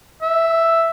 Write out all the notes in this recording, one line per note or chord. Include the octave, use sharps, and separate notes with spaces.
E5